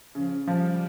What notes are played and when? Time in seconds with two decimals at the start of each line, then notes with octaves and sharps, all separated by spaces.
0.15 C#3 F3
0.47 F3 G3